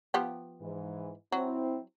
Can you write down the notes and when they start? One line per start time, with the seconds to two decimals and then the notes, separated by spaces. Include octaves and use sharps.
0.14 F3 B3 G4
0.61 G#2 E3
1.32 F#3 C4 E4